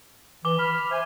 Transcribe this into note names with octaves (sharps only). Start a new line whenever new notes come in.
E3 D6 G7
B5 F6
C5 E5 G#5